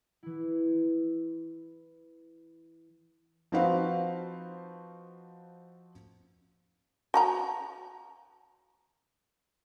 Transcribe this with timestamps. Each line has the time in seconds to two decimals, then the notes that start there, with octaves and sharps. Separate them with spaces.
0.23 E3 E4
3.52 F3 C4 D#4 F#4 B4 F5
7.14 F#4 A5 A#5